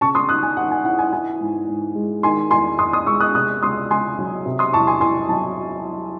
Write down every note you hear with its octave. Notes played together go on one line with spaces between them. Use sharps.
C#3 A5 C#6
C6 D#6
D#2 D#6 F#6
G#5
D#2 F#5
G#5
E3 F#5
G#5
E3 G#5
G#2
G#2
G#3
D#3 G#5 C6
E2 G#5 C6
E2 C6 D#6
C6 D#6
G#3 C#6 E6
D#6 F#6
C3 D#6 F#6
C#2 C6 D#6
C#2 G#5 C6
F#3
C3
C6 D#6
E2 A5 C#6
G#5 C6
E2 G#5 C6
F#3 A5